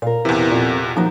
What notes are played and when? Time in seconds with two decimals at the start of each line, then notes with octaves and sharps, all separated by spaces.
0.02 A#2 A#4 F5
0.25 E2 C3 E3
0.51 F2 A#2
0.97 D#2 F3 F#3 D#4